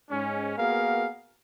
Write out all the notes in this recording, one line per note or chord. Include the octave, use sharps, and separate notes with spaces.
G#2 G#3 C#4
A#3 B3 F#4 G#4 A#4 F5